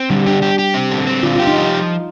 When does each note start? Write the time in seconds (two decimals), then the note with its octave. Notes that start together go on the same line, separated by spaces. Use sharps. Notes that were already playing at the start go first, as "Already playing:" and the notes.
Already playing: C4
0.10 D3 G3
0.26 D4 G4
0.42 G4
0.59 G4
0.74 C4
0.91 D3
1.07 C4
1.23 D3 F4
1.36 F4 G4
1.47 D#4
1.56 F3